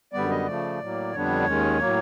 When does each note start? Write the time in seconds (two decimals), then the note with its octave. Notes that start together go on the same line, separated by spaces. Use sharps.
0.13 F#2 D3 G3 B3 D5
0.30 D#5
0.46 C#3 F3 A3 D5
0.80 A2 F#3 A#3
1.13 F2 D3 G3 B3 D4 C#5
1.46 D#2 D#3 G#3 C#4
1.79 A2 F#3 A#3